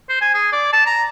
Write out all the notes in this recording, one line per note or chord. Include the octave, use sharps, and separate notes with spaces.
C5
G#5
G#4
D5
A5
A#5